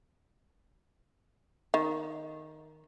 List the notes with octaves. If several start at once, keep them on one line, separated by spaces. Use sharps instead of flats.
D#3